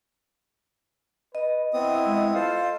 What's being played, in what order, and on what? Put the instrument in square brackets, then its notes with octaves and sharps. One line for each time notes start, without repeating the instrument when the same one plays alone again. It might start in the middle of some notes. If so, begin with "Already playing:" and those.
[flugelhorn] B4 [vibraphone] D#5
[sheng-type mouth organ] B3 C4 D#6 [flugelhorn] E4
[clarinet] G#3
[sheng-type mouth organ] F4 A4 C5 [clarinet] F5